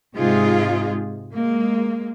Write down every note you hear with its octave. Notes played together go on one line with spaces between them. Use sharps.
G#2 C3 G#3 D#4 F4 G#4
G#3 A#3